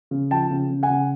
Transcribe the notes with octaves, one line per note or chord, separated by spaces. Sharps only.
C#3
F3 G5 A5
C#3
C#3
F#5 G#5
C#3